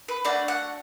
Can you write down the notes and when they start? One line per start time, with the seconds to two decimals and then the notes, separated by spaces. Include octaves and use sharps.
0.08 B4
0.25 A3 D4 F#4 D5
0.48 F#5